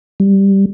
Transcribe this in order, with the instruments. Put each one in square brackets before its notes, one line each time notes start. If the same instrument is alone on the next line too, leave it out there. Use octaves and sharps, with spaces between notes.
[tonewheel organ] G3